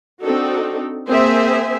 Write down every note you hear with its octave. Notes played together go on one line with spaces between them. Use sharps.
C4 D4 D#4 F#4 A4
A#3 C4 G#4 C5 E5 G#5